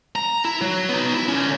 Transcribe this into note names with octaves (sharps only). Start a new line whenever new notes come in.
A#5
E4
F#3
B3 D#4
E4
D3 C#4